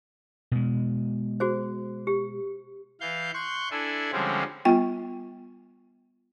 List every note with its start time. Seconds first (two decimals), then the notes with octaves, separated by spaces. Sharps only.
0.51 B2 G#3
1.40 F#4 G#4 C5
2.07 G4
3.01 E3 F5 G6
3.34 C6 C#6 F#6 G6
3.71 D4 E4 A4 G#5
4.12 D3 F3 G3 G#3 C4 C#4
4.65 G3 B3 F4 G5